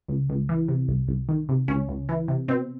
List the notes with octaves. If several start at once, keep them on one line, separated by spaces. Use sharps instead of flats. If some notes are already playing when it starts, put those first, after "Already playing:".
C#2
C#2
E3
C3
C2
C2
D#3
C3
C#2 C#4
C#2
E3
C3
B2 C4